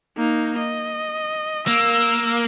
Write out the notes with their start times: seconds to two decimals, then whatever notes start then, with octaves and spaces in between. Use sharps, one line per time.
0.18 A#3 D#4
0.58 D#5
1.67 A#3 E6